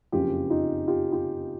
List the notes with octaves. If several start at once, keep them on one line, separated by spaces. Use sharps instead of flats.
F#1 F2 C#3 F4 G4
D#4 F4
F4 G4
F4 G4